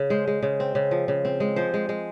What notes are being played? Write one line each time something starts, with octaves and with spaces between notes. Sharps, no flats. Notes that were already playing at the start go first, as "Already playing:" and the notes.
Already playing: C#3
G#3 C5
G#3
C#3
C4
C#3
F3
C#3
C4
G#3
F3 C5
G#3
G#3